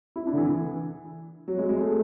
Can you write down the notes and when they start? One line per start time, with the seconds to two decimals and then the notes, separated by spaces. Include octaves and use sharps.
0.16 E4
0.27 D4
0.33 D3
0.38 E3
1.48 F#3
1.59 G#3
1.69 G#3
1.81 A3